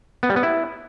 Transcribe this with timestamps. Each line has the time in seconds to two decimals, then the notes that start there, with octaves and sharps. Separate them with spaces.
0.23 B3
0.30 G3
0.36 B3
0.43 E4